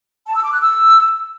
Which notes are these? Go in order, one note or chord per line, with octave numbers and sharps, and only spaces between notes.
A5
E6
D6
F#6
E6